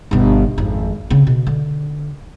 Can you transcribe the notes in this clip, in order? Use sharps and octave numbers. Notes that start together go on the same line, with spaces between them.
G1 B2
G#1 F2
C#3 C4
B2
D3